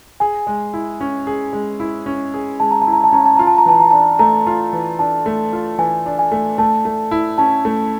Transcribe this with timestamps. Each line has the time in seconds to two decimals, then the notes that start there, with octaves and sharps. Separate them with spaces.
0.20 G#4 G#5
0.47 G#3
0.74 E4
1.01 C#4
1.27 G#4
1.53 G#3
1.80 E4
2.06 C#4
2.34 G#4
2.60 G#3 A5
2.71 A#5
2.82 A5
2.87 E4
2.93 A#5
3.04 A5
3.12 C#4 A#5
3.25 A5
3.36 F4 A#5
3.47 A5
3.58 A#5
3.66 E3 A5
3.80 A#5
3.91 D4 A5
4.19 A3 A#5
4.47 F4
4.73 E3
4.99 D4 A5
5.26 A3
5.53 F4
5.78 E3 G#5
6.06 D4
6.19 G#5
6.32 A3
6.58 A3 A5
6.85 A3
7.11 E4
7.38 C#4 A5
7.65 A3